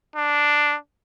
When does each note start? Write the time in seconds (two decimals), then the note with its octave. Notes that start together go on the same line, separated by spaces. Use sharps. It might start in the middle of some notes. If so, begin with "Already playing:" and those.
0.16 D4